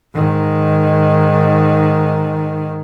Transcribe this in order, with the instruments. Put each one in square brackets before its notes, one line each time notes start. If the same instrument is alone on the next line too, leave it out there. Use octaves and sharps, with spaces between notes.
[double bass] G#2 D#3